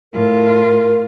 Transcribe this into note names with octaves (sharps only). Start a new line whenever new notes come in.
A2 F4 A#4